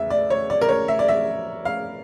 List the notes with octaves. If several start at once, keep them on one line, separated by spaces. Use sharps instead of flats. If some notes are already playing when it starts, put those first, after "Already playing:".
Already playing: E2 C#3 E5
D5
C#5
D5
A#4
C#5
E5
D5
E5
F5